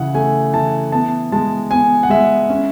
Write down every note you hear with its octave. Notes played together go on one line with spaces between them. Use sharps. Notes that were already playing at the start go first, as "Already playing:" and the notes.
Already playing: C#3 E3 F#5
A3 G#5
E3 A5
B3 A5
G#3 A5
B3 G#5
F#5
G#3 E5
C#4